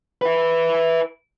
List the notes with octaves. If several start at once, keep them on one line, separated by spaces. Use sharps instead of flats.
E4 B4